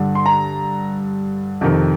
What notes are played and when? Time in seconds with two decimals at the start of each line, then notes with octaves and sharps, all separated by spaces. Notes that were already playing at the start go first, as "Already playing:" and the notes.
Already playing: G2 D3
0.15 C6
0.26 A#5
1.61 F2 C3 D#3